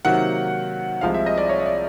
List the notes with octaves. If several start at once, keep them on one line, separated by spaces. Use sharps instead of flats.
C3 D#3 F#3 A#3 F#5
C2 C3 F3 G#3 C4 F5
E5
D#5
D5
C#5
D5